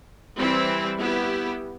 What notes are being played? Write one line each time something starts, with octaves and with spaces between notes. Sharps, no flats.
E3 G3 C4 E4
B3 E4 G4